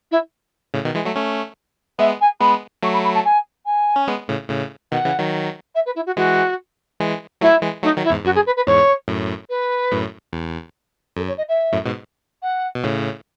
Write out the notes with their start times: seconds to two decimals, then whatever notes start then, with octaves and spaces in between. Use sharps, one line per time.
0.11 E4
0.74 A2 C#3
0.85 B2 D#3
0.95 E3 G#3
1.05 F#3 A3
1.15 A3 C#4
1.99 G#3 B3 E5
2.21 G#5
2.41 G#3 B3 B5
2.83 F#3 A3 C#6
2.93 B5
3.04 B5
3.15 A5
3.25 G#5
3.66 G#5
3.96 C#4
4.08 G#3 B3
4.28 A2 C#3
4.50 A2 C#3
4.92 B2 D#3 F#5
5.05 C#3 E3
5.19 D#3 F#3
5.75 E5
5.86 B4
5.96 E4
6.06 F#4
6.17 E3 G#3 F#4
7.00 E3 G#3
7.41 F#3 A3 E4
7.62 E3 G#3
7.83 F#3 A3 D#4
7.97 D#3 F#3
8.04 E4
8.10 E2 G#2
8.25 F#2 F#4
8.35 G#4
8.46 B4
8.56 B4
8.66 E2 G#2 C#5
9.08 F#2 A2
9.49 B4
9.92 F#2 A2
10.33 E2
11.17 F#2 A4
11.28 C#5
11.37 D#5
11.48 E5
11.72 F#2 A2
11.85 G#2 B2
12.42 F#5
12.75 B2
12.84 A2 C#3